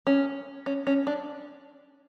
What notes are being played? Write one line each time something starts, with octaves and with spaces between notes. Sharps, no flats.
C#4
C#4
C#4
D4